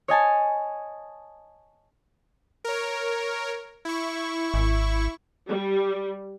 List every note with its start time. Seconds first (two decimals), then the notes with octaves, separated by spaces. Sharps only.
0.08 C#5 D#5 G#5 A5
2.64 A#4 C#5
3.85 E4 C#6
4.54 G#1
5.48 G3